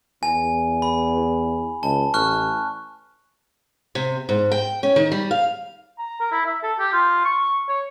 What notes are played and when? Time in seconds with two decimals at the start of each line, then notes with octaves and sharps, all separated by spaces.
0.23 E2 G#5
0.82 B5
1.83 C#2 A5
2.14 A1 C#6 F6 F#6
3.95 C3
4.29 G#2
4.51 G5
4.83 C#4
4.96 D#3
5.12 G3
5.31 F5
5.99 A#5
6.20 A#4
6.32 E4
6.46 E5
6.63 A4
6.79 G4
6.93 F4
7.25 C#6
7.69 C#5